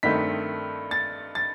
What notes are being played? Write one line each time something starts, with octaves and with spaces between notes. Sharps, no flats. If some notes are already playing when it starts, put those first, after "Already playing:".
G2 D#3 A3 C4 D#4 B6
A6
A6